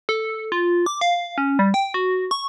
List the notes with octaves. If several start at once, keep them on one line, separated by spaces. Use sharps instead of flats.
A4
F4
D6
F5
C#4
G3
G5
F#4
C#6